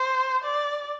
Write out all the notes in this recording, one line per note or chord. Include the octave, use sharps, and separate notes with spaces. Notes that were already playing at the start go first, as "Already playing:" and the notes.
Already playing: C5
D5